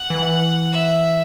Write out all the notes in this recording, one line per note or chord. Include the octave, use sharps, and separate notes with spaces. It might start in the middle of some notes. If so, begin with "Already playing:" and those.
Already playing: F#5
E3
E5